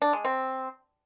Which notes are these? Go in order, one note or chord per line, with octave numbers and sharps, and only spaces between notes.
D4
G#3
C4